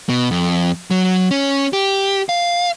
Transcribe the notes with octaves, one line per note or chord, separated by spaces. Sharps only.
B2
F2
F#3
C#4
G4
F5